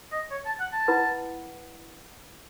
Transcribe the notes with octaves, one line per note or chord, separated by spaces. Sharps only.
D#5
C#5
A5
F#5
A5
E4 B4 F#5 B5